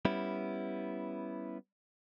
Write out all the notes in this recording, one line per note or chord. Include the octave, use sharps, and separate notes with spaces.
G3 B3 C#4 E4